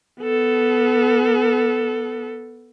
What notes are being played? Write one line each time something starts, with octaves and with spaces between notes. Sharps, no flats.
B3 A4